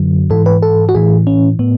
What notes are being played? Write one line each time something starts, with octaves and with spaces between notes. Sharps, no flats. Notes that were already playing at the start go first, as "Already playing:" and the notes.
Already playing: F#2 D3 F#3
G#2 E3 A4
B4
A4
F#4
A2 E3 G#4
C#4
A2 B3